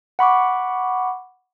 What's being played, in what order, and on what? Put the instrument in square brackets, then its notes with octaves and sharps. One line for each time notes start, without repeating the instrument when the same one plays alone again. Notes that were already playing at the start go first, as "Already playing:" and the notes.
[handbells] F#5 B5 C#6 D6